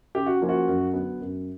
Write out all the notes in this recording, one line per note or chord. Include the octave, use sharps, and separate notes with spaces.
C#3 G4
F#4
F3 A#3 C#4 F4
F#4
F#2
D3 F#3 B3
F#2